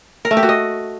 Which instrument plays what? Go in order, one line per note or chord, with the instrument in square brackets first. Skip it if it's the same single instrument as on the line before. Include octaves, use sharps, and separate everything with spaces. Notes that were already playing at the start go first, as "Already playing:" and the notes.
[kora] A#4
A3
G4
F#4
D#5